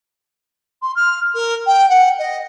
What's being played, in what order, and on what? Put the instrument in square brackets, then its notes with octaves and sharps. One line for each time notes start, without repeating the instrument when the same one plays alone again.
[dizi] C6
F6
A#4
G5
F#5
D#5